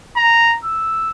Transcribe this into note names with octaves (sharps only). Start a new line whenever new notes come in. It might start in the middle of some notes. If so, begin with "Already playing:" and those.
A#5
E6